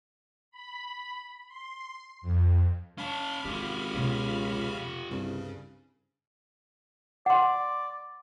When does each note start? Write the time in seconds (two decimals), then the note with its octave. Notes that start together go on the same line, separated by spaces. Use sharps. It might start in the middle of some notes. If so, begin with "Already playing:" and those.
0.51 B5
1.48 C6
2.22 F2
2.98 C#4 F5 A5 B5 F6
3.45 G#1 C#4 F4 G4
3.94 C#2 B2 D3
5.11 C2 G2 C#3
7.26 D5 F#5 C6